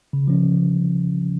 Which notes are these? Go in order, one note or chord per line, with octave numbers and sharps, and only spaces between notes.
C#3
F3 C#4
C#3
F3